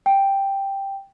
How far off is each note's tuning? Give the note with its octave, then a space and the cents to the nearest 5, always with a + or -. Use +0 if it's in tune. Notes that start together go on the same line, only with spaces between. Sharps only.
G5 +0